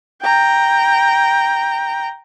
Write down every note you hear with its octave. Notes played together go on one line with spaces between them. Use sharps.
G5 A#5